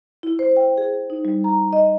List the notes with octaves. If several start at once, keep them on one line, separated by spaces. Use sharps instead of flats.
E4
C5
G5
G#4
D#4
G3
A#5
D#5